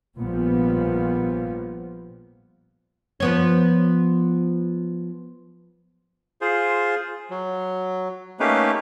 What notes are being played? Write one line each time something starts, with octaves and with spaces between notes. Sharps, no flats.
A#1 A#2 F3 G3 B3
F3 B3 C#5
F4 G#4 C5
F#3
A3 A#3 C#4 D#4 G4 B4